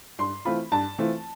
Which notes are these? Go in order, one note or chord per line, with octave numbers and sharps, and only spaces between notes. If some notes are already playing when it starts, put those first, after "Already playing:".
G2 C6
E3 A3 C4 F4 B5
G2 A5
E3 A3 C4 F4